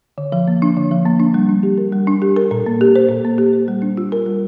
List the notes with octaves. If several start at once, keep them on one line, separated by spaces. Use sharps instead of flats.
D3
F3
A#3
D4
D3
F3
A#3
D4
G3
D4
G4
A#4
G3
D4
G4
A#4
A#2
A#3
G4
C5
A#2
A#3
G4
C5
G3
D4
F4
A#4
G3